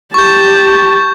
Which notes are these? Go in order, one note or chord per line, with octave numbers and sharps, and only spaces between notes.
G4 A5 C#6 G6